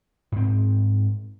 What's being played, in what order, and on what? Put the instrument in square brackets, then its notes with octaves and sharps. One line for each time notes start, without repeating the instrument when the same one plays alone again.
[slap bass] G#2 C4